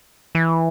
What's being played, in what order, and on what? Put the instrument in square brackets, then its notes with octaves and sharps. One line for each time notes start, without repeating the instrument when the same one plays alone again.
[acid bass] E3